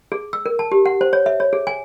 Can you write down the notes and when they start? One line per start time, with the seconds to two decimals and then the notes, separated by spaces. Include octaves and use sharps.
0.12 G#4
0.33 E6
0.46 A#4
0.59 A5
0.72 G4
0.86 F#5
1.01 C5
1.13 C#5
1.26 E5
1.40 C#5
1.53 G#4
1.67 G#5